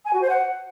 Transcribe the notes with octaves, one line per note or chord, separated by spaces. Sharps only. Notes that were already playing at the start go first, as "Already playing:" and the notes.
G#5
F#4
C5
F#5